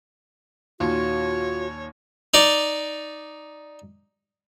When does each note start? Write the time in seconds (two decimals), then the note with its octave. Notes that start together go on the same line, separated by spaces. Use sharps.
0.80 D#2 A#2 F4 F#4 C#5
2.34 D#4 D5